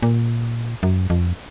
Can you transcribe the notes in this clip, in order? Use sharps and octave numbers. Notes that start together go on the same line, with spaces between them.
A#2
F#2
F2